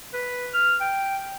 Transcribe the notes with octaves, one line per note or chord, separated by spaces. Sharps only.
B4
F6
G5